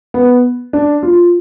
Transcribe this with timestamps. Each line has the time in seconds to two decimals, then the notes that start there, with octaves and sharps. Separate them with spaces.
0.14 B3
0.73 D4
1.03 F4